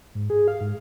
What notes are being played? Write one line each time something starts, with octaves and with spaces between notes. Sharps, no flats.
G#2
G#4
F5
G#2